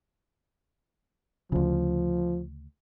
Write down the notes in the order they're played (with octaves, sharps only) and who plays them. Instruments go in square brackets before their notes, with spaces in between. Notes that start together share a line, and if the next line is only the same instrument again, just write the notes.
[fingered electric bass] D2 C#3 [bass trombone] F3